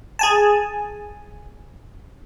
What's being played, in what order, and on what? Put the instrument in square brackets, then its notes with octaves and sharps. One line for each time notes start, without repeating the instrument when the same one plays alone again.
[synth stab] G#4 G#5 A5